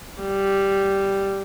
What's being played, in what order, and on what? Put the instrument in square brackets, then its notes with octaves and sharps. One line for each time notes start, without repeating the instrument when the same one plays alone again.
[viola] G3